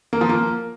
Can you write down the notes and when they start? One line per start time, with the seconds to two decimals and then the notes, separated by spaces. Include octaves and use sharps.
0.13 A#3
0.21 F3
0.29 A#3